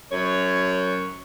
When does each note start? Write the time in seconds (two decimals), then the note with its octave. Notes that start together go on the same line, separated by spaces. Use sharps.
0.12 F#2 C#5